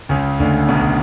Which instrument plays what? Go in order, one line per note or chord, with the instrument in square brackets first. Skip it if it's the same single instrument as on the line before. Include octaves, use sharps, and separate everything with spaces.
[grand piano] C#2 C#3
D2 D3
B1 B2